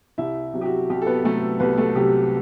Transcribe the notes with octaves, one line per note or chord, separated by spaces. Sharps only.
C2 E4 E5
C3 F#3
G4
F#4
C2 G4
A4
B3 B4
C3 F#3 A3 A4
C2 B3 B4
A3 A4
C3 F#3 G4